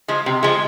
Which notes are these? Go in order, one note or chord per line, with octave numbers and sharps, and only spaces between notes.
F3 G#3
C3
F3 G#3